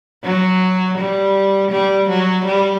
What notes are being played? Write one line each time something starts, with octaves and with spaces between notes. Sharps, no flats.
F#3
G3
G3
F#3
G3